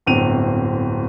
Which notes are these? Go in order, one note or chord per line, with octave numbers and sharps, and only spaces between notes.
D1 G1 C4 D#7 F7